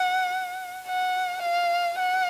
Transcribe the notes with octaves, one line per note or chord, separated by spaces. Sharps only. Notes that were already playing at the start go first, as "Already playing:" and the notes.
Already playing: F#5
F#5
F5
F#5